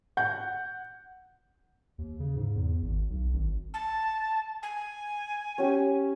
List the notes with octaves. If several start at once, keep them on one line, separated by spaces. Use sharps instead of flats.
F#5 G6
D#2
C#3
G#2
E2
G#1
B1
G#1
A5
G#5
C#4 G4